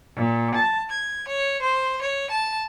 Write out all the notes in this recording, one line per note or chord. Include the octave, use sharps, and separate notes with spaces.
A#2
A5
G#6
C#5
C5
C#5
A5